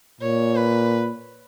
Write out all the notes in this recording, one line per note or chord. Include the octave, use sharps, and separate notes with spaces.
A#2 C#5
B4